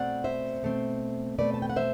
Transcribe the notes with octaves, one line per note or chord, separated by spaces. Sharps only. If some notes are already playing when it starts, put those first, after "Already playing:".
Already playing: B2 A3 C4 D5 F#5
C5 E5
B2 A3 C4
B2 A3 C4 B4 D5
A5
G5
F#5
C5 E5